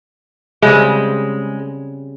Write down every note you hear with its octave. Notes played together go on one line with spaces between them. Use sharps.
C#3 G3 G#3 C4